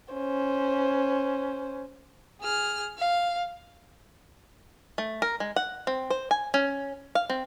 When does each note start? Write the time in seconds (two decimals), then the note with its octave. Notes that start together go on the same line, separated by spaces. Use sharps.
0.13 C#4 C5
2.41 G#4 F6
2.98 F5
4.98 A3
5.22 A#4
5.40 G#3
5.56 F#5
5.87 C4
6.10 C5
6.31 G#5
6.54 C#4
7.15 F5
7.30 C4